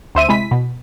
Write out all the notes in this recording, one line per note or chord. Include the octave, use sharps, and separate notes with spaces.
D2 C5 E5 D#7
C3 G#3 E4 B6
B2